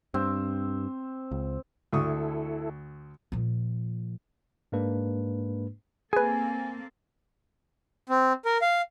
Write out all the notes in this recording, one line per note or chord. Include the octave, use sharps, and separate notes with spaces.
G2 C4
C#2
D2 E4 A4 C#6 D#6
A#2 F3
G#2 G#3 A#3 D4 B4
A#3 C4 G#4 A4 B4 G#5
C4
A#4
F5